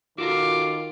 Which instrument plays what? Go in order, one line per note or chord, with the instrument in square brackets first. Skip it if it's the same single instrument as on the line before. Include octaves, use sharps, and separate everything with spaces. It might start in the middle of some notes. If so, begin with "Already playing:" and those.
[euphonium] D#3 [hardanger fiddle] F4 [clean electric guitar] F#4 A4 A#4 [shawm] D6